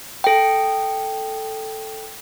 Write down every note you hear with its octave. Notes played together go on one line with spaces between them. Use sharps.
A4 G5